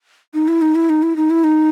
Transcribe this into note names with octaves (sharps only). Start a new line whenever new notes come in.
D#4
E4
D#4
E4
D#4
E4
D#4
E4
D#4